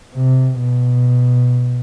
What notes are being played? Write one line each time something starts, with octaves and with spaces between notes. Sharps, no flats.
C3
B2